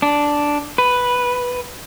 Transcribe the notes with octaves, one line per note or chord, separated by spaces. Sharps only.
D4
B4